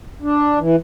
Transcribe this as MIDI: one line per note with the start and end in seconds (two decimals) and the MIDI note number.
0.22 0.59 62
0.59 0.76 52